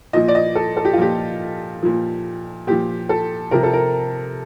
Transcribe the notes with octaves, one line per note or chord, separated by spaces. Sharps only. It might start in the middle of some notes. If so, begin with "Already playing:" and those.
A#2 F3 D#5
D5
D#5
A4
A4
G4
F4
A#2 F3 G4
A#2 F3
A#2 F3 G4
A4
C3 F3 A#4
A4
A#4